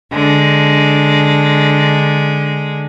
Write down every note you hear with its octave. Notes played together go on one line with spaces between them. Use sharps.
D3 G#3